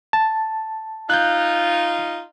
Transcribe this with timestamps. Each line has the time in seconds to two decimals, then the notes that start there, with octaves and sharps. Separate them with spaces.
0.13 A5
1.10 D#4 F4 F#6 G6